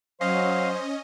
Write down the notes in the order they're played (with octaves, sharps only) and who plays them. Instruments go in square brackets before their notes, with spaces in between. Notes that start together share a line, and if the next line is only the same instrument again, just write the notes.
[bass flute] F#3 [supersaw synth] C#4 D#5 [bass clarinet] C5 [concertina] F5